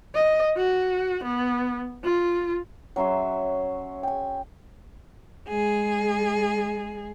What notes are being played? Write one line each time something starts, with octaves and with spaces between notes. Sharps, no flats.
D#5
F#4
B3
F4
F#3 C#4 E5 C6
G5 G#5
G#3 G#4